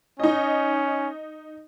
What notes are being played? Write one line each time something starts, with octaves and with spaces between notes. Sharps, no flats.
C#4 D#4 D#5